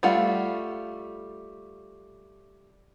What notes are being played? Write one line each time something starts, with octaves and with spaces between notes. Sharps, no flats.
G3 A3 F4 F#5